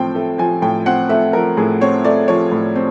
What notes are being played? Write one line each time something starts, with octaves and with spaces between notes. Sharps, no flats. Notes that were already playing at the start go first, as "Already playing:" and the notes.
Already playing: A2 F3 C4 G5
A3
F3 G#5
A2 G5
C4 F#5
A3 E5
F3 A#4
A2 G#4
C4 C#5
A3 D5
F3 C#5
A2
C4